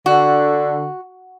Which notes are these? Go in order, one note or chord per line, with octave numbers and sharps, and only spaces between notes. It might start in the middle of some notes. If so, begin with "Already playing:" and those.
D3 F#4